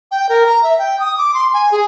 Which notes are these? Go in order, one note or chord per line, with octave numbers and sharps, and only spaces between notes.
G5
A#4
A#5
E5
G5
D#6
D6
C6
G#5
G#4